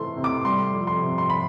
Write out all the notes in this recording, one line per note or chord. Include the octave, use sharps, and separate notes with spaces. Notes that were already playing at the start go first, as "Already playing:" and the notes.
Already playing: C3 E3 A3 C4 C6
C3
D6
G3 C6
F2
C6
C3
C6
B5